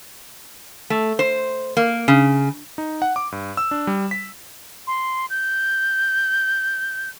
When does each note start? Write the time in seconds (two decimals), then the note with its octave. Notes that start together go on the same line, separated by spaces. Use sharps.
0.90 A3
1.19 C5
1.77 A#3
2.08 C#3
2.78 D#4
3.02 F#5
3.16 D6
3.32 G2
3.57 E6
3.71 D4
3.87 G3
4.11 B6
4.87 C6
5.30 G6